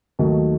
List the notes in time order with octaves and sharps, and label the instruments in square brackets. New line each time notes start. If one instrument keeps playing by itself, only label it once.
[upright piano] D#2 D#3 F#3 A3